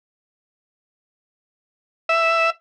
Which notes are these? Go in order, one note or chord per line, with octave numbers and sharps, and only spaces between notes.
E5